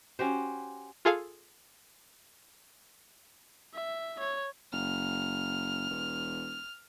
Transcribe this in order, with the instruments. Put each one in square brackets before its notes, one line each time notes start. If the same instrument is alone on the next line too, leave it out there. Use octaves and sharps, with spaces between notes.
[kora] C#4 F#4 G4 C5
[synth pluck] F4 G#4 A4 F5
[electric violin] E5
C#5
[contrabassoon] F#1 [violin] F6
[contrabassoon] E1